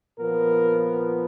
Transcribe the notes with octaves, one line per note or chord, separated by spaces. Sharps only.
A#2 F3 B3 A#4